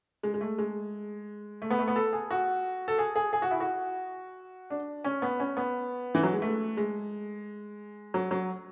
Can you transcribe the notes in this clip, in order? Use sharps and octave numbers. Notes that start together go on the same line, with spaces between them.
G#3
G#3
A3
G#3
A3
B3
A3
B3
A4
G#4
F#4
A4
G#4
G#4
G#4
F#4
E4
F#4
D4
C#4
B3
C#4
B3
E3
F#3
G#3
A3
G#3
F#3
F#3